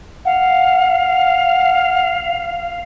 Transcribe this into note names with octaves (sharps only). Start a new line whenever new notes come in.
F5 F#5